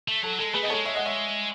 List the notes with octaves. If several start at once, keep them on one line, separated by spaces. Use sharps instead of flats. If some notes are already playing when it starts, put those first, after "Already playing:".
A3
F#3 A4
G#3 A4
A3 G#4 B4
B3 D#5
G#3 A4 C#5
C#5 E5
D#5 F#5
C#5 E5